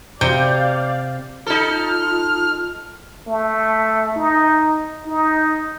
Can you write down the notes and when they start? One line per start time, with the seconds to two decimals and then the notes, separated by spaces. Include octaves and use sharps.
0.21 C3 D5 F5 G6
1.46 D#4 F4 A4 F6
3.28 A3
4.16 D#4
5.06 D#4